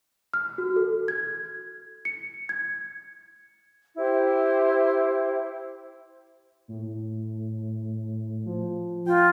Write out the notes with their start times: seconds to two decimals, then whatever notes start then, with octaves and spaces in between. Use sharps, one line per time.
0.33 F6
0.58 F#4
0.76 A4
1.08 G#6
2.05 C#7
2.49 G#6
3.96 E4 G4 C5
6.68 A2
8.46 F3
9.06 F4 G5